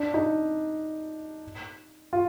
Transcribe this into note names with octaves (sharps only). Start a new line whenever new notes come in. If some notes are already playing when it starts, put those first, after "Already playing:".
Already playing: D4
D#4
F4